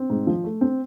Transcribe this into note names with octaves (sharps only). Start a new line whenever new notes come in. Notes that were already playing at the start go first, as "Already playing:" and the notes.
Already playing: C4
G#2
F3
A3
C4